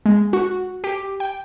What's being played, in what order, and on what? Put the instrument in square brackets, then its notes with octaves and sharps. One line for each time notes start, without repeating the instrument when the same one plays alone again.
[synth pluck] G#3
F#4
G4
G5